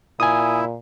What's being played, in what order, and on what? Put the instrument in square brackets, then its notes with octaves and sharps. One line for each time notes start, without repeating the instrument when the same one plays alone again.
[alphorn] A#2 [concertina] E4 [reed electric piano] G#5 D#6